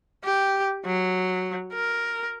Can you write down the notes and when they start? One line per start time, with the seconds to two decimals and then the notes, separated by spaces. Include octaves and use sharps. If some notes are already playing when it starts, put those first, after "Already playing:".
0.24 G4
0.86 F#3
1.73 A#4